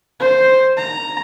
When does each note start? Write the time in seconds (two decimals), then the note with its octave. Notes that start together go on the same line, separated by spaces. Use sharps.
0.20 C5
0.77 A#5